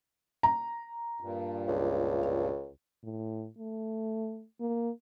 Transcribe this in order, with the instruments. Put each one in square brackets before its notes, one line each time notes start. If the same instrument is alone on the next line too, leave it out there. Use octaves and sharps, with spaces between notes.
[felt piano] A#5
[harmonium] G2 A#2
[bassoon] C#2
[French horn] A2
A3
A#3